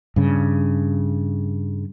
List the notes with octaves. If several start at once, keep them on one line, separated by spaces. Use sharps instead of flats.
G2 C#3